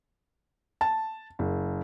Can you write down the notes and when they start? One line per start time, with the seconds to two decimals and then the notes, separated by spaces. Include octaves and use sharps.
0.81 A5
1.39 F#1